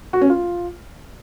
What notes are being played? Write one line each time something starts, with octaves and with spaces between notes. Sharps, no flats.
F#4
C#4
F4